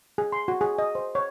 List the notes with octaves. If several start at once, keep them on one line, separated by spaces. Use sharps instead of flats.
G#4
C6
F#4
G#4
D#5
C5
C#5